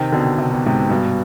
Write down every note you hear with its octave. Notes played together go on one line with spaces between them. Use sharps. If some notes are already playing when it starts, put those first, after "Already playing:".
Already playing: C3 D#3
B2 D3
C3
B2
G#2 C3
G2 B2